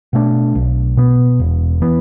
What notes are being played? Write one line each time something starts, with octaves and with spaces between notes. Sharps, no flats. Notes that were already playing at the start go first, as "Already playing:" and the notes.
B2 A3 D4
B1
B2 B3
E1
E3 B3